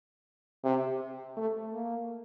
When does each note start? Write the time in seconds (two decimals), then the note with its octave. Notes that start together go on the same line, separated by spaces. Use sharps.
0.64 C3
1.37 A3
1.74 A#3